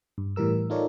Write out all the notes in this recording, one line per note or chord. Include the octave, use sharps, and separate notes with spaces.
G2
A2 E3 G3 A#4 E6
D#4 F4 A4 A#4 C#5 D5